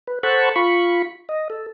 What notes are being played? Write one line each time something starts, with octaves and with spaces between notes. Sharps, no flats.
B4
A4 C5 F#5 A5 B5 C#6
F4 B5 C#6
D#5
A4